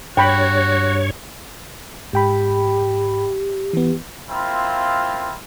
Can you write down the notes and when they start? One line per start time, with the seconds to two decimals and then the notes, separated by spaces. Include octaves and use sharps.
0.17 G2 F#4 C#5 G5 B5
2.13 G#2 G4 G5 B5
3.73 E3 B3
4.30 A#3 C4 E4 F4